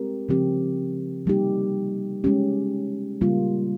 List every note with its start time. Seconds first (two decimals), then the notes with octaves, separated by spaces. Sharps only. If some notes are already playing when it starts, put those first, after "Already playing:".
Already playing: G#3 C4 G4 A#4
0.29 C#3 F3 C4 G4
1.26 C3 G3 A#3 D#4 G4
2.24 G#3 C#4 G4
3.21 C#3 G3 A#3 F4